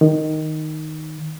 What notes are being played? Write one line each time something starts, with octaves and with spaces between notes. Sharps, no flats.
D#3